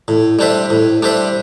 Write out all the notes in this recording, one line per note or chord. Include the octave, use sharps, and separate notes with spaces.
A2
G3 D4 C5 E5
A2
G3 D4 C5 E5